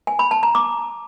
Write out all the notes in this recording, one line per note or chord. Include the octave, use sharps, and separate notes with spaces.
G#5
B5
A5
A#5
D6